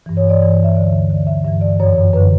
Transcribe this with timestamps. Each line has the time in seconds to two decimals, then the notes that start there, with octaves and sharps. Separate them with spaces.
0.06 G2 E3
0.17 C#5
0.29 D5
0.40 G2 E3 D5
0.52 C#5
0.64 E5
0.75 D2 D3 D5
0.93 E5
1.09 G2 D3 D5
1.27 E5
1.45 G2 E3 E5
1.61 D5
1.80 F#2 E3 C#5
2.13 F#2 D3 B4